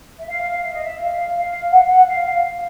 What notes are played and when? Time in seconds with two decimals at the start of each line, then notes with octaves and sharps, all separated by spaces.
0.19 E5
0.27 F5
0.63 E5
0.72 D#5
0.83 E5
1.00 F5
1.35 F5
1.71 F#5
1.86 F#5
2.07 F5